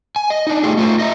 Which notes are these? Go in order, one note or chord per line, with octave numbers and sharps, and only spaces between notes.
G#5
D#5
D4 D#4
A3 F4 G4 G#4
A3 F4 C5
D#5 E5 A#5